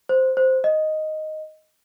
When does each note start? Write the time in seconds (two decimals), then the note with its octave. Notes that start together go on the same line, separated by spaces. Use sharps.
0.09 C5
0.37 C5
0.64 D#5